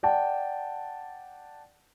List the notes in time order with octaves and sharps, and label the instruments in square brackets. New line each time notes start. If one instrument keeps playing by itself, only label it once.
[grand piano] D5 F#5 G5 A5